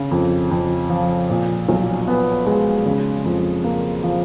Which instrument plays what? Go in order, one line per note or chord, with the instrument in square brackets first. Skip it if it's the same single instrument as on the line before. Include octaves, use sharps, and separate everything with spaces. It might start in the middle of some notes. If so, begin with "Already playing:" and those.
Already playing: [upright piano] C#3
F2
F2
F3
A#2
B1
B3
G#3
C#3
F2
A#3
F3